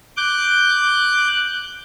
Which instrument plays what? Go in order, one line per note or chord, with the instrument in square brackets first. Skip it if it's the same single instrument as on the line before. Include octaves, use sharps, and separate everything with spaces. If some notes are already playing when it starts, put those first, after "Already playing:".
[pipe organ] D6 F#6 G6